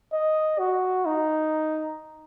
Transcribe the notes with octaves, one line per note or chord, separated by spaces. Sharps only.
D#5
F#4
D#4